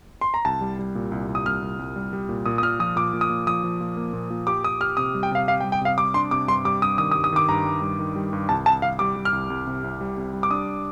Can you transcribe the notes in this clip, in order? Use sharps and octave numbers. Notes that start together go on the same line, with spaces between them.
C6
A#5
C2 A5
G3
G3
A#2
C2
C2
D#6
C2 F6
C2
C2
G3
G3
A#2
A#2 D#6
D#6
A#2 F6
F3 D#6
A#2 D6
A#2
D#6
A#2
F3 D#6
F3
A#2
A#3
A#2
A#2
G4 D6
G4 D#6
G4 F6
C3 D#6
G3
G5
C3 F5
G4 F5
G5
G3
G5
C3 F5
G3 D6
D4 C6
C3 D6
G2 C6
G3 D6
G2 D#6
D#3 D#6
D#6
G2
D#6
D#3 D6
G2 A#5
G3
G2
D#3
G3
G2
C2 A5
C2 A5
C2 F5
G3 D6
G3
F6
C2
C2
C3
C2
G3
C3
G3
D6
D4 D#6